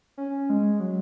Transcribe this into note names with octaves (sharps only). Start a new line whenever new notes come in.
C#4
G#3
F#3